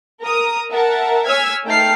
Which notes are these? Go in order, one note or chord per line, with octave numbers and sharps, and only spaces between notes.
A#4 A#5 D#6
A#4 E5 F#5 A5
C#5 G#5 E6 F6 G#6 B6
A3 D#4 G5 A5 F6 C7